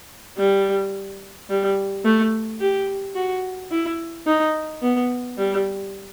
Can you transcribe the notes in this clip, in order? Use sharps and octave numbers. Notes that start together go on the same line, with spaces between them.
G3
G3
A3
G4
F#4
E4
D#4
B3
G3